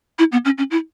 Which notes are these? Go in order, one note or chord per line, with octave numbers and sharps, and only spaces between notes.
E4
B3
C#4
C#4
E4